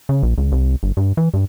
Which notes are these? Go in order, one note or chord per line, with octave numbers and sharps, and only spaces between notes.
C#3
A#1
C#2
C2
G1
G2
E3
G2